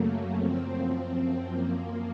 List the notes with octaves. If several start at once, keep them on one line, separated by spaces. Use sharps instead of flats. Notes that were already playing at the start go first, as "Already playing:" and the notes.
Already playing: F#2 C#3 F#3 A3 A#3
F#2 F3 C4
C4
F#2 F3 A#3